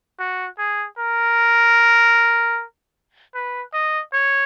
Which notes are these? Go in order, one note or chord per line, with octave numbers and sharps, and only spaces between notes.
F#4
G#4
A#4
B4
D#5
C#5